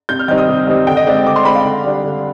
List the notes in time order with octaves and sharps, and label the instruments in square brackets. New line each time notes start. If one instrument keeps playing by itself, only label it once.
[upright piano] C3 G6
F6
D#3 G3 C4 D#4 G6
D#6
C3
D#3 G3 C4 D#4
D3 G5
D#5
G#3 C4 D5
D#5
D3 D6
C6
G#3 C4 B5
F5
D3
G3 D4
D3